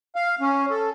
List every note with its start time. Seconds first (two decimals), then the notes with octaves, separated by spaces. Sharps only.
0.16 F5
0.41 C#4
0.70 A4